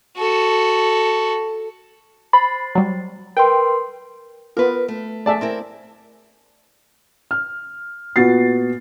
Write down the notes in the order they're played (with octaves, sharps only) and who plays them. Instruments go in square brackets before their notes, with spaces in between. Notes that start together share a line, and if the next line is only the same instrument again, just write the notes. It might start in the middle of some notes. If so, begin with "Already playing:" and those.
[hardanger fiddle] F#4 A4
[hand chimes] C5 A6 C7 [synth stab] B5
[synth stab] F#3 G3
[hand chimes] A#4 B4 C6 [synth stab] G5
[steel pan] B3 F4 [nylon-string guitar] A#4 B4
[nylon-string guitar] A3
[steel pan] A3 G#4 E5 [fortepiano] D5 A5
[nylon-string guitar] C4 E4 A#4
[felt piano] F6
A#2 B3 F#4 A6 C7